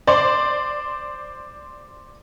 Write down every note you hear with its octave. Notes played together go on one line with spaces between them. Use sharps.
C5 D5 C6